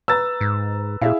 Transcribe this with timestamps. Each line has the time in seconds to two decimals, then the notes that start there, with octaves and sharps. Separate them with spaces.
0.08 B4 A#5 E6 A6
0.41 G#2
1.01 A#2 E4 G#4 E5 F5